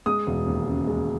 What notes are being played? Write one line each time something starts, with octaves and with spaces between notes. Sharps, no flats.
G#3 D#6
E1
D#2
C#3
G#3